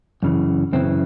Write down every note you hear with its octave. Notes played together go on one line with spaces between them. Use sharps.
F#2 C#3 E3
F#2 C#3 E3 C4